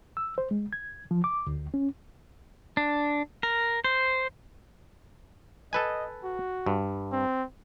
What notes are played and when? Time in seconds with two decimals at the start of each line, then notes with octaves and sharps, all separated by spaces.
0.17 E6
0.38 C5
0.51 G#3
0.73 G#6
1.11 F3
1.24 D6
1.47 D2
1.74 C#4
2.77 D4
3.43 A#4
3.84 C5
5.73 A4 B4 D#5 G#5
6.24 F#4
6.66 G2
7.12 C4